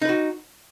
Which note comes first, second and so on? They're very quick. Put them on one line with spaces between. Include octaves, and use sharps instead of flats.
D#4 B4 F#4